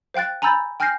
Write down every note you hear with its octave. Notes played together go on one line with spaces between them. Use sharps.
C5 F5 G5 F#6 A6
G#5 A#5 B5 E6 G6 A6
G5 G#5 F6 G6 A#6 C7